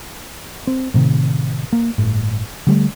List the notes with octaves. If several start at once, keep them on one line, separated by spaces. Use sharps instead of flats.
C4
A2 C3 D#3
A#3
G1 A2
D3 G3 A3